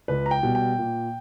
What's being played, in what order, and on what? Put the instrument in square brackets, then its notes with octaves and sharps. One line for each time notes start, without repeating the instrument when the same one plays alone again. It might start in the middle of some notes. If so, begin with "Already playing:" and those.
[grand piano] C#2 B4
A#5
G5
B2 G3
G5
A#2